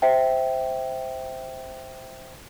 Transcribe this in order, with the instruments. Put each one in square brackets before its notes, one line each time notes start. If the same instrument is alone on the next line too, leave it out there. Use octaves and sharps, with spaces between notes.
[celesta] C5 E5 G5